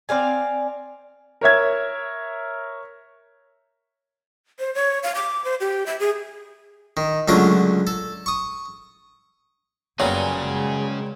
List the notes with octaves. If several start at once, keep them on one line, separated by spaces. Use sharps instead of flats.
C4 D5 F5 G#5
A#4 C#5 E5 G#6
C5
C#5
F5
D6
C5
G4
E5
G#4
D#3
C#2 D3 F#3 A3 F4 A#4
A4
C#6 D#6
F#1 A#2 F#3 G3 A#3 B3 C#4 G#4
C#3 G#3